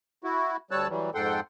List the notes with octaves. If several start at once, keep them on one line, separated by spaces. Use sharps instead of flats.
E4 F#4
D2 G3 C#5 A5 E6 F#6
E3 F#3 G3
F2 G#2 A4 F#5 G5 C6